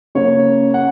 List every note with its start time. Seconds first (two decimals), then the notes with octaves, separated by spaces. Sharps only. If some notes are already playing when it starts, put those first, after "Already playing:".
0.15 C#3 A#3 C#5
0.74 F#5